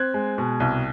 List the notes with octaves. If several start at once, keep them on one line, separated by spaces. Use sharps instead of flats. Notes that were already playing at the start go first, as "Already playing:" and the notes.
Already playing: C4 F#6 G#6
G#3
B2
C2